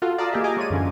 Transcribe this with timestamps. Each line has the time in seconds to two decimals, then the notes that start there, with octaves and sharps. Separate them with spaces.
0.02 F4 F#4 A4
0.18 D5 F5 A5 A#5 D#6
0.32 A#3 G4 G#4 D#5 E5
0.44 D#5 G#5 A#5 D6
0.57 G#3 C#5 D5 D#7
0.70 F#2 D3 E3 C#4 F4